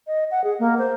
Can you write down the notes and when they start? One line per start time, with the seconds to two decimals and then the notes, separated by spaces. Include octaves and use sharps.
0.07 D#5
0.31 F#5
0.44 G#4
0.60 A#3
0.79 C5